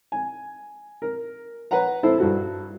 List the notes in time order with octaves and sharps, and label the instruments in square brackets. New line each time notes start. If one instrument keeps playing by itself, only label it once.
[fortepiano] G#5
A#4
B4 C#5 F#5 A#5
E4 A4 C5
G2 F#4 A4